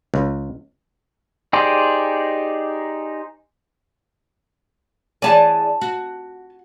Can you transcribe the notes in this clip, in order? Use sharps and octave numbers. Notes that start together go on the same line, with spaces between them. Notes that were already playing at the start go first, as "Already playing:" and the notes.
C#2
D#4 G4 G#4 C5 D5
E3 G#4 D5 G#5 A5
F#4